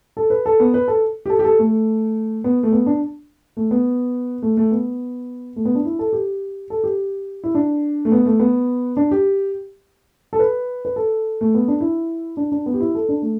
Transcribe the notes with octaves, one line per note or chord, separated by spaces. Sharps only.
A4
B4
A4
B3
B4
A4
G4
A4
G4
A4
A3
B3
A3
B3
D4
A3
B3
A3
A3
B3
A3
B3
D4
E4
A4
G4
A4
G4
E4
D4
A3
B3
A3
B3
D4
G4
A4
B4
B4
A4
A3
B3
D4
E4
D4
D4
B3
G4
E4
A4
D4
A3